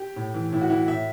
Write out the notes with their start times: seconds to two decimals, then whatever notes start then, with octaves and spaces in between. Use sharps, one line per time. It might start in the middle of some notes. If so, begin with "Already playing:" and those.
Already playing: G4
0.16 A2
0.34 E3
0.52 A2 E4
0.62 F#4
0.70 E3 E4
0.88 A2 E5